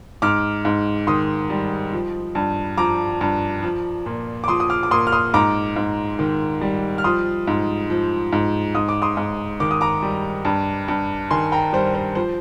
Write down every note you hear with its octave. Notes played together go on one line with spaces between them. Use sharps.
G#2 D6 F6
G#2
D#3 C6 D#6
G3
F3
G2
F3 A#5 D6
G2
F3
A#2
D6
F3 C6 D#6
D#6
D6 F6
D6
A#2 C6 D#6
F6
C6 D#6
G#2 A#5 D6
G#2
D#3
G3
F6
F3 C6 D#6
G#2
F3
G#2
G#2 D#6
D6
C6 D#6
G#2
D#3 D6
D#6
A#5 D6
G3
G2
G2
D#3 G#5 C6
G5 A#5
G3 C5
C5
F3 C5